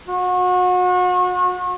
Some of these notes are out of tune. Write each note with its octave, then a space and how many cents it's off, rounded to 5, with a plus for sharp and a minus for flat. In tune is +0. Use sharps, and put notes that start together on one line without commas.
F#4 -35